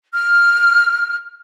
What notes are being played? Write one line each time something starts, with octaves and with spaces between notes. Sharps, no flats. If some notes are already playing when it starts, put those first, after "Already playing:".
F6